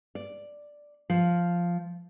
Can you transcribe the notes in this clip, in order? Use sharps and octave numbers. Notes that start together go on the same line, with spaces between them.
D5
F3